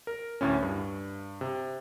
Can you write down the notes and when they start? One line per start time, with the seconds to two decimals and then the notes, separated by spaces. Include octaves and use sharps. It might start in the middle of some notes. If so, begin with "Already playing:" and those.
0.07 A#4
0.41 D2 A2 C#4
0.62 G2
1.41 C3